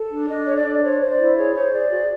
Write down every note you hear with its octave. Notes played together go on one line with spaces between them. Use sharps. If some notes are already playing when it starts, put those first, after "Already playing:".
Already playing: A4
D4
D4 D#5
A4 C#5
D5
D4
C5 C#5
C5
D#5
D5
E4
G#4 C#5
C5 C#5
G#4 D5
F#4